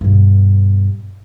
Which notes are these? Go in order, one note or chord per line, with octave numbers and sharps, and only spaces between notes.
G2 B2